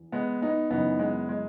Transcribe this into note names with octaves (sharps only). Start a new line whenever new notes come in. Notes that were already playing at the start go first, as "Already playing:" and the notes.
Already playing: E2
G#3 B3
B3 D#4
F#2 C#3 E3 B3 D#4
G#3 B3
G#3